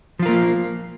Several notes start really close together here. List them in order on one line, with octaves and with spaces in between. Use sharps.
F3 F4 A#4 A#3